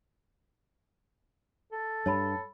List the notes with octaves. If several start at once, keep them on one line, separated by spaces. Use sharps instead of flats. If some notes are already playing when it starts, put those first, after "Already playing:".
A4
G2 C#5 A5 B5